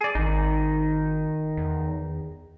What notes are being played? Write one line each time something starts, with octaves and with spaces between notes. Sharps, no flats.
G#4 D5
G#1 D#3 D#4
E2